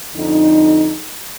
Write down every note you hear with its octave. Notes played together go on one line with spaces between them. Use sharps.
F2 D3 D#4